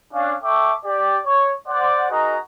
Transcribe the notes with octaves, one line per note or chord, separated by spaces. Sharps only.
C#4 D4 F5
A4 E5 G5 C#6 D6
G4 D5
C#5
C5 D5 F#5
D#4 F#4 G#4 A#4 D#5 A#5